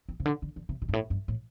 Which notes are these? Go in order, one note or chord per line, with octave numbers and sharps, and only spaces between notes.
C4
C3
D3
D3
D3
C3
B2
G2
A2
G2
A2